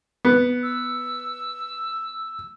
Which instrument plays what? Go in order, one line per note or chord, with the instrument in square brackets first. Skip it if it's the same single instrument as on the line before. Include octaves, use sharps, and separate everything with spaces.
[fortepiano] B3
[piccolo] E6